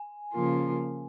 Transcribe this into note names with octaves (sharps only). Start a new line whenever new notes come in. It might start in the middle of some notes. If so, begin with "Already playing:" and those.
Already playing: G#5
C#3 F3 A#3 F4